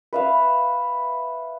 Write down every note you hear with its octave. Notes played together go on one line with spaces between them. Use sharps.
B4 E5 F5